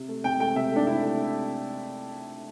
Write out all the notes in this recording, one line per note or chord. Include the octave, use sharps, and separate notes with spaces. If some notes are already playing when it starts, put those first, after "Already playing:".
Already playing: C3
A3
C3 G5
A3 G5
C3 E5
A3 D4
C3 E4
A3